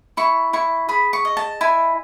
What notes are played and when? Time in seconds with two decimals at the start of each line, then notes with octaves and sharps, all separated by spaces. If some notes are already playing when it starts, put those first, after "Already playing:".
0.17 E4 C#6
0.53 E4 C#6
0.89 G#4 B5
1.13 C#6
1.25 D#5
1.37 A5
1.61 E4 G#5